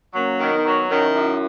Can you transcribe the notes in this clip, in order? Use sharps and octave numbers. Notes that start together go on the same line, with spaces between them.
F#3 A#3 C#4
D#3
B3 D#4
F#3
D#3 C#4 E4
F#2